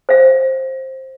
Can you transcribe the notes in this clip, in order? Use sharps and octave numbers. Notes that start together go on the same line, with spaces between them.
C5 F5